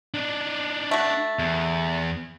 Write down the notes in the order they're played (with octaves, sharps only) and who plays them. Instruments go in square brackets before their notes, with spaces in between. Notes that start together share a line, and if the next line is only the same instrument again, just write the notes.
[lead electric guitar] D4 D#4
[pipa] A3 F#4
[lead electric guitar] E2